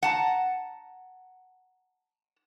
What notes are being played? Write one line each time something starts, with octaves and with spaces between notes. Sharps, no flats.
F#5 A5 A#5